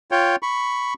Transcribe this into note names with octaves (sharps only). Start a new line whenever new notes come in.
F4 C#5 G5
B5 C#6